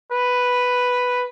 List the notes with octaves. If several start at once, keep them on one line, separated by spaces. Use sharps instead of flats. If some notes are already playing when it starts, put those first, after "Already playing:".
B4